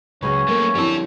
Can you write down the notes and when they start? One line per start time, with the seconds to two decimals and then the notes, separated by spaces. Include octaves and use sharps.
0.23 C#2 F#3 C#4 G#4 B4
0.49 A3 A#3 A#4
0.75 F2 D3 G3 E4 C#5 A5